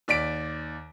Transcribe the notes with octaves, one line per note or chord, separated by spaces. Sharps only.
D#2 D5 B6 D7